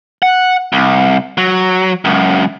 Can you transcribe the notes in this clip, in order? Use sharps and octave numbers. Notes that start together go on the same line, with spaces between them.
F#5
C2
F#3
C#2 F#2